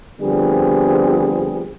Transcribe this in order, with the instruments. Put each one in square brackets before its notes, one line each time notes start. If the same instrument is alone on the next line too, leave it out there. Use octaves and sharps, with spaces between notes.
[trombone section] D3 F3 G3 B3 C4 G#4